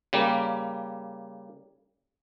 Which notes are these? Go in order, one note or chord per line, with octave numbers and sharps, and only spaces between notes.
C#3 G3 A#3